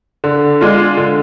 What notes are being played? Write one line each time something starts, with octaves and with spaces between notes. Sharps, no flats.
D3
G#3 D4 F4
D3